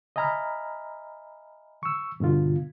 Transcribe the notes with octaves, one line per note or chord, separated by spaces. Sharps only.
D#5 E5 G#5 A#5 B5 F6
C#6 E6
G2 B2 D3 F4